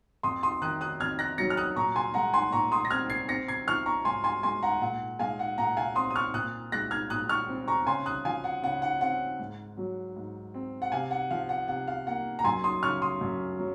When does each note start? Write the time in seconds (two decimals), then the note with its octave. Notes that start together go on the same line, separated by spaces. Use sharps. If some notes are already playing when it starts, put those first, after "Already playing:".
0.23 F2 C6 D#6
0.43 C6 D#6
0.62 D#3 D#6 F#6
0.81 D#6 F#6
1.00 F2 F6 G#6
1.19 F#6 A#6
1.38 F#3 A#6 C#7
1.50 F6
1.57 D#6 F#6
1.76 A#2 A#5 C#6
1.96 G#5 C6
2.14 G#3 F#5 A#5
2.33 G#5 C6
2.52 A#2 A#5 C#6
2.72 C6 D#6
2.85 A#6
2.91 C4 F6 G#6
3.10 G#6 C7
3.29 C4 A#6 C#7
3.48 G#6 C7
3.67 F3 C#6 F6
3.86 A#5 C#6
4.05 G#2 G#5 C6
4.24 G#5 C6
4.43 G#3 G#5 C6
4.63 F#5 A#5
4.82 A#2 F#5
5.19 G#3 F5 G#5
5.39 F#5
5.58 A#2 F#5 A#5
5.77 F5 G#5
5.96 C4 C6 D#6
6.10 D#6
6.16 C#6 F6
6.34 A#2 D#6 F#6
6.72 G#3 F#6 A#6
6.91 F6 G#6
7.10 A#2 D#6 F#6
7.29 C#6 F6
7.48 C4
7.68 A#5 C#6
7.87 C#3 G#5 C6
8.06 D#6 F#6
8.25 F3 F5 G#5
8.44 F#5
8.63 C#3 F#5
8.82 F#5
9.01 C4 F#5
9.39 G#2
9.77 F#3
10.16 G#2
10.54 C4
10.82 F#5
10.92 C3 F5 G#5
11.11 F#5
11.31 F3 F5
11.49 F#5
11.68 C3 F#5
11.88 F5
12.07 A#3 F#5
12.39 A#5
12.44 F#2 G#5 C6
12.64 C6 D#6
12.83 C#3 C#6 F6
13.02 C6 D#6
13.21 F#2
13.59 F#3